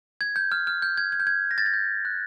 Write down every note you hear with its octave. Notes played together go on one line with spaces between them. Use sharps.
G#6
G6
F6
F6
G6
G#6
G#6
G6
G#6
A#6
A6
G#6
G6
F#6